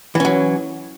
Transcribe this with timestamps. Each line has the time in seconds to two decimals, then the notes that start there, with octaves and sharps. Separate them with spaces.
0.15 E3
0.20 C#4
0.25 F#3